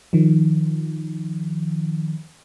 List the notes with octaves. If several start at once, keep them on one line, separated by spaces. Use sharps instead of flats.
D#3 F3